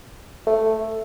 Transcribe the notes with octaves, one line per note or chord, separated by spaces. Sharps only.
A3